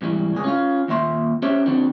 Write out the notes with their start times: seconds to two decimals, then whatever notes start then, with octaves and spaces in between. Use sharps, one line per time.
0.02 G#2 E3 G3
0.33 C#2 G#2 G#4
0.44 C#4 F4 F5
0.88 D#2 A#2 E5 C6
1.42 C#4 G4 C5 C#5 E5
1.66 D3 F3 C4 D4